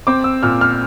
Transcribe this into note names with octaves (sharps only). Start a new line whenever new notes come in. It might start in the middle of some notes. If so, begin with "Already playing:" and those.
C4 D6
E6
A#2 F6
F6